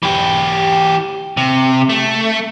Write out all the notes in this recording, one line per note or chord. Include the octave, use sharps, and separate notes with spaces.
E3 G4
C3
A3